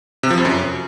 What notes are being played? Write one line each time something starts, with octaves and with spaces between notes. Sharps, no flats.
C3
F3
F2
F#2